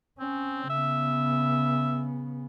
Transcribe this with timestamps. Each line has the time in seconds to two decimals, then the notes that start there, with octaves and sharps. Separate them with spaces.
0.20 C4 C#4
0.70 C#3 B3 E5